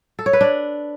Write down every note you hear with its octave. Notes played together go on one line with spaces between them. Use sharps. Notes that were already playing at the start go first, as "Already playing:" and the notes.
A4
C#5
B4
D4